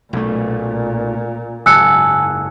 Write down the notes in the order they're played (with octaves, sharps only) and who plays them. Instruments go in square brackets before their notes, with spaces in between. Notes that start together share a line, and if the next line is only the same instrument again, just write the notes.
[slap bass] B1 A3 [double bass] A#2
[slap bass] F#1 G#2 [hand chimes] G#5 A5 [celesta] E6 F#6 C#7